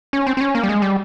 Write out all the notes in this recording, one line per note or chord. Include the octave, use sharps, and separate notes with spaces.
C#4
C4
C4
C#4
A#3
G3
G#3
G3